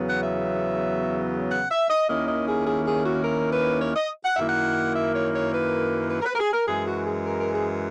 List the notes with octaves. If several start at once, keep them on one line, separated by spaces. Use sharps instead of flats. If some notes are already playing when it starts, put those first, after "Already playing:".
Already playing: E2 C#3 F#3 B3
F#5
E5
F#5
E5
D#5
D#2 D#3 A#3 C#4 E4 D#5
D#5
G#4
G#4
G#4
F#4
A#4
B4
C#5
D#5
F#5
F#2 D#3 A#3 E4 E5
F#5
E5
C#5
C#5
B4
B4
A#4
B4
A#4
G#4
A#4
F#2 E3 G#3 G#4
F#4
G#4
A#4
A#4
G#4